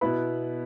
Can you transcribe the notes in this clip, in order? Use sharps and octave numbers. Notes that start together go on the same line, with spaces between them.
B2 B3 E4 B4 B5